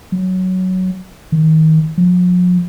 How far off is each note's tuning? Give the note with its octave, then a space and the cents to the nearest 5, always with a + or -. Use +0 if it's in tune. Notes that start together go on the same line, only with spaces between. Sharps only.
F#3 +5
D#3 +25
F3 +45